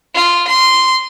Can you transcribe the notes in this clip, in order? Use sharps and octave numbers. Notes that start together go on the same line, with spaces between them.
F4
C6